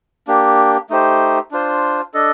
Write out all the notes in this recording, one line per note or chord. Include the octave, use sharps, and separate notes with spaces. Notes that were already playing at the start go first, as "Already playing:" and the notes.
A#3 D4 G4
A3 D#4 G4 C5
D4 F4 C5
D4 A4 D#5